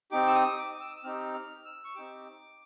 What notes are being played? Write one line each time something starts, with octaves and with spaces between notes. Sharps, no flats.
C4 D#4 G4 D6
E6
D#6
D6
E6
E6
C4 D#4 G4 F6
F6
E6
C#6
C4 D#4 G4 D6